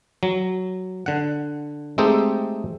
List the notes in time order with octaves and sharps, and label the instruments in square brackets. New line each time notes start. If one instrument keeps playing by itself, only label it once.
[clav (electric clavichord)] F#3
D3 F#5
G#3 A3 C4 D#4 G4 A4